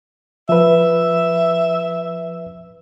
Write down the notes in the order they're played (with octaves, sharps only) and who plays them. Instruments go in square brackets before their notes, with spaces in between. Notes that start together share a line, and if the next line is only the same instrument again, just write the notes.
[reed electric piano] F3 B4 [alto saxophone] E5